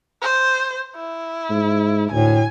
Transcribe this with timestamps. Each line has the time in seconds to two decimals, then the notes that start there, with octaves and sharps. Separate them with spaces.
0.22 C5
0.96 E4
1.50 G#2
2.12 D2 A2 G#5